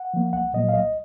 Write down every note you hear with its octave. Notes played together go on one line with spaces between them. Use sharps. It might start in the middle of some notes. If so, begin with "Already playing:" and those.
Already playing: F#5
F3 A#3
C2 F#5
A#2 F#3 A#3 D#5
F5
C2 D#5